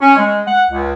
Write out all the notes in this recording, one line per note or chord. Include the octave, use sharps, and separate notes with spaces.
C#4
G#3
F#5
C#2